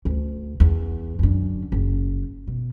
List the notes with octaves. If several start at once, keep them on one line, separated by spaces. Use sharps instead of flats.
D2
E2
F#2 D3
F#1
B2